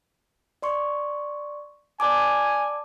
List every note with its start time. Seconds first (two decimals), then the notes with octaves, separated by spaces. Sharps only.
0.62 D5 C6 C#6
2.00 D5 G#5 A5 D6